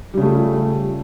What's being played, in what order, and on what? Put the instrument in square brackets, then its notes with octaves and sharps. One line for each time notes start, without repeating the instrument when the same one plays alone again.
[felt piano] G3
C#3
A3
F4